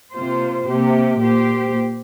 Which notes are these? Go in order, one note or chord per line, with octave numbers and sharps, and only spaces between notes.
C3 A#3 F4 C5
C3 A#3 G4
A#2 A#3 G4 C5